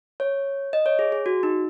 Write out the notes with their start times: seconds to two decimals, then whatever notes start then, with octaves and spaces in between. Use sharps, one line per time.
0.20 C#5
0.73 D#5
0.86 C#5
0.99 G#4
1.12 G#4
1.26 F#4
1.43 D#4